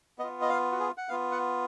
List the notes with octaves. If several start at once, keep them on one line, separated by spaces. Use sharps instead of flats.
B3 F4 D#5
D#5
F5
F#4
G#4
F#5
B3 F4 F5
F#5